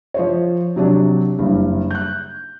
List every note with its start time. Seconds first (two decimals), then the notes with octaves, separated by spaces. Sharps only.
0.14 F3 C5 C#5
0.76 C3 F#3 D4
1.39 F#1 G2
1.91 F#6 G6